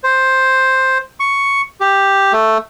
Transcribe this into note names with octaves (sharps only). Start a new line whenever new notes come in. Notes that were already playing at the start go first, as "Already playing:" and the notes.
C5
C#6
G4
A3